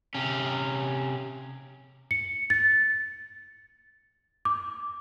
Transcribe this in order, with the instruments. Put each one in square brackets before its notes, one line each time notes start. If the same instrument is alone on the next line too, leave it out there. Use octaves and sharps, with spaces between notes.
[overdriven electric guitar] C3 C#4
[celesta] C#7
A6
D6